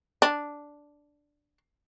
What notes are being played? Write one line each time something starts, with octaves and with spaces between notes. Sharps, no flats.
D4